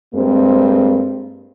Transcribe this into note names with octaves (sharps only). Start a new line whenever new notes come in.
G2 G#3 A#3 C4